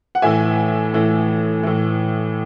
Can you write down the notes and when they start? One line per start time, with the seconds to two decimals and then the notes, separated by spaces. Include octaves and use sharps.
0.15 F#5
0.22 A2 E3 E5 G#5
0.94 A2 E3
1.63 A2 E3